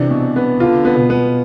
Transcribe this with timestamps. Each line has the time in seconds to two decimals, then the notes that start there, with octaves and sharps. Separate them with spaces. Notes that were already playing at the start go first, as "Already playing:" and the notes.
Already playing: C3 E3 D4
0.10 B2
0.36 B3
0.60 D3 F4
0.85 B3
0.98 B2
1.10 B3